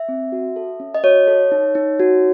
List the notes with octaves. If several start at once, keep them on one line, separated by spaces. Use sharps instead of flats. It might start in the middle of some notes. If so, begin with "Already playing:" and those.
Already playing: E5
C4
F#4
A4
C#4
D#5
F#4 C#5
A4
D#4
D#4
F#4